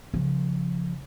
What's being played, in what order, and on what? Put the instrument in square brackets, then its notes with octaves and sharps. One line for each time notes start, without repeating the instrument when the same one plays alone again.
[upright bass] C#3 F3